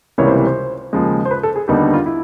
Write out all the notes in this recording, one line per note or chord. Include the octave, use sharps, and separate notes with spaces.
C#2 C3 E3 G3 A#3 C#5
C5
C#5
C5
D#2 C#3 F3 G#3
C5
B4
A4
G#4
D#2 D3 G3 B3 D#4 G4
F#4
F4
E4